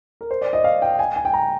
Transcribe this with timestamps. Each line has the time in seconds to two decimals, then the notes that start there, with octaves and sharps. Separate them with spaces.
0.21 A#4
0.31 C5
0.42 D5
0.53 D#5
0.64 F5
0.82 G5
0.99 G#5
1.16 G#5
1.25 G5
1.34 A#5